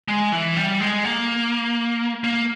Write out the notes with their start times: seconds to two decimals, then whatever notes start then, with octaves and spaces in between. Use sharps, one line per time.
0.08 G#3
0.32 E3
0.56 G3
0.80 G#3
1.05 A#3
2.24 A#3